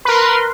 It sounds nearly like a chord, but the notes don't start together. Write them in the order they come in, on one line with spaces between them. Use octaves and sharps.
B4 A#4 C6